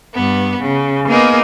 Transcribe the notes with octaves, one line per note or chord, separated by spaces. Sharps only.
G2 B3
C#3
A#3 B3 D#4 G#4 A#4